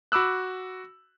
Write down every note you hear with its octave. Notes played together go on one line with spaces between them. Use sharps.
F#4 B5 D6 E6 F#6